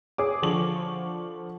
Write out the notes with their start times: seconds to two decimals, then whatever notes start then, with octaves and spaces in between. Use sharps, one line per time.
0.18 G#4 C#5 D6
0.42 D3 F3 C#6 D6 F#7